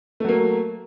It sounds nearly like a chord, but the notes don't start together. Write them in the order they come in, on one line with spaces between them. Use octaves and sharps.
A3 F#3 A#3